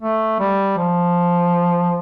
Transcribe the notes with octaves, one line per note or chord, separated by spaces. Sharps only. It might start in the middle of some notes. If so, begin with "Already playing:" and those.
A3
G3
F3